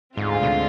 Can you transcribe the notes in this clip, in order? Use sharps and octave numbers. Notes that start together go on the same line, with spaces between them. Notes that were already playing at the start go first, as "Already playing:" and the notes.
D2 G#2 D3 G#3 C4 F4
B2